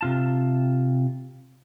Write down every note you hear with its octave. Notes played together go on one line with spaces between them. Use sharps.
C3 F4 A5